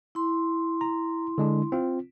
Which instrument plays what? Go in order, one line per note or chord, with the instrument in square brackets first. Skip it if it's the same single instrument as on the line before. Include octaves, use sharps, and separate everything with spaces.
[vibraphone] E4 C6
[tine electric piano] A#5
D3 G#3 D4
C4 F4